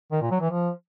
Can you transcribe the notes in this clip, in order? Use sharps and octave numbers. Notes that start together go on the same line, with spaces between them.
D#3
A#2
F#3
E3
F3